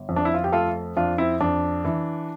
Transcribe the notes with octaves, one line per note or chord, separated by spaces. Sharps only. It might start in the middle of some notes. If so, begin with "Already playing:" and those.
Already playing: G1
F2
D4
E4
F4
G4
A3 F4 A4
F2 D4 F4
C4 E4
F2 D4
E3